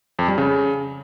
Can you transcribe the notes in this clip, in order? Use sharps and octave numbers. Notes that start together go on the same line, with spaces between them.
F2
G3
C#3